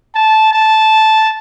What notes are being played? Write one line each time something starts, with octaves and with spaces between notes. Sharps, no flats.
A5
A5